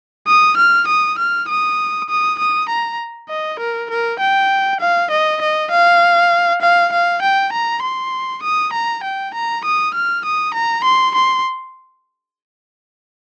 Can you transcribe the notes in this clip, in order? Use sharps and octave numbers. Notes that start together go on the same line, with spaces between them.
D#6
F6
D#6
F6
D#6
D#6
D#6
A#5
D#5
A#4
A#4
G5
F5
D#5
D#5
F5
F5
F5
G5
A#5
C6
D#6
A#5
G5
A#5
D#6
F6
D#6
A#5
C6
C6